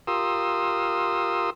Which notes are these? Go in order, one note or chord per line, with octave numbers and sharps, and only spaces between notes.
F4 G4 A#4 C6 D#6 E6